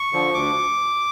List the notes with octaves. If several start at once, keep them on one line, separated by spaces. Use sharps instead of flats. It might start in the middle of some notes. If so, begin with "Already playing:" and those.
Already playing: C#6
D3 F3
D2 D6